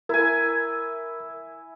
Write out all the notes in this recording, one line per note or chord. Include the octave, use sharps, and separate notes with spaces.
E4 A#4 G#5